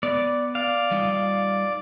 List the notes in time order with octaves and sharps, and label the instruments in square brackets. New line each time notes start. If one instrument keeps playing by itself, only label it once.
[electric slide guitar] B3 [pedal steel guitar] D5
[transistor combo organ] D5 [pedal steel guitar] F5
[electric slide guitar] G3 D#4 F4